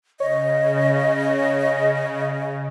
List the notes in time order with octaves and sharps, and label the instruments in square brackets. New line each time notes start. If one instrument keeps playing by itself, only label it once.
[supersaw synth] C#3 [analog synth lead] C#5 [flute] D#5